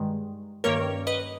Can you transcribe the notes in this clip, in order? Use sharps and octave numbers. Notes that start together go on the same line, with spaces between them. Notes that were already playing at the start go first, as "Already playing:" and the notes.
Already playing: G2 D#3 G#3
G2 D#3 A#3 C#4 A#4 C#5
B4 D#5